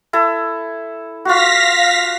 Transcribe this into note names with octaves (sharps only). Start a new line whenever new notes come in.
E4 A4
F4 F#4 F5 A#6 B6